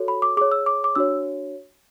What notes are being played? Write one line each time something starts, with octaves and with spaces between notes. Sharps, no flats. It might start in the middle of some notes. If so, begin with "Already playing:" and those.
Already playing: F#4 A4 C#5
B5
D6
G#4 C#5 D6
E6
D6
D6
D4 F#4 C#5 E6